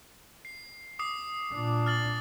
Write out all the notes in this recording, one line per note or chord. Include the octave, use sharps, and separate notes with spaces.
C7
D6 D#6 C7
A#2 D4
F6 A6 F#7